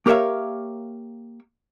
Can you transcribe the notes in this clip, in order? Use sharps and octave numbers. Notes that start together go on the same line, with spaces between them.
A#3 G4 A#4 C#5 E5 F5